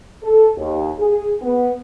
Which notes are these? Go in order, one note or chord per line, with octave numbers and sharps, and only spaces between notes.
A4
D#2
G#4
B3